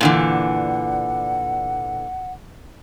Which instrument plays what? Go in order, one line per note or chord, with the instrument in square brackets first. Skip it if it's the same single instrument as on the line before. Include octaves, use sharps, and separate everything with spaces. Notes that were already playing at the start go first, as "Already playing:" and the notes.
[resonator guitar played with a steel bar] A#2 D3 E3 [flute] F#5